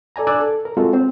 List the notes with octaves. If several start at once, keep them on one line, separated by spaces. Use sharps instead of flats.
A4 D5 G#5 A#5
D4 D5 G#5 E6 F#6
A4
A#4
G#3 C4 F4 F#4 A4
C4 C5